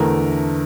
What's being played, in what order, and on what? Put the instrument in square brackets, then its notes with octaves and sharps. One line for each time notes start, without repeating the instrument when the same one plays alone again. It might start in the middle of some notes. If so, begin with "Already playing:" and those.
Already playing: [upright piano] E2 D3 A3 A#4 A#5